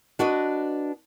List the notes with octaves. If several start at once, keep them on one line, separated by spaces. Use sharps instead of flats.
D4 F#4 B4 D#5